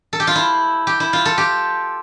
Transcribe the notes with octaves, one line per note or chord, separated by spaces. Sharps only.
A4
G4
F4
E4
G4
E4
F4
A4
G4